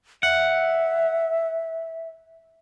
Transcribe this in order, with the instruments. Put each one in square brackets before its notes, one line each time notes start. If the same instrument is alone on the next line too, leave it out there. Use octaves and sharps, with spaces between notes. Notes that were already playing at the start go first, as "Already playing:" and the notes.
[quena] E5 [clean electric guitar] F#5